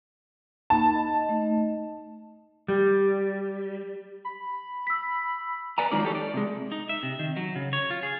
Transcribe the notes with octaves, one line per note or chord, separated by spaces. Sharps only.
A#3 D#4 A5 B5
D#5
A3 D#4 D#5
G3
B5
E6 B6
B4 D5 G#5 A#5
D#3 F#3 G#3 D#4 F4 D5
E3 G4 A4 C#5
D5
C3 G#3
D#4
E5
C3
D#3
F#3
C#3
C#5
F4
G#4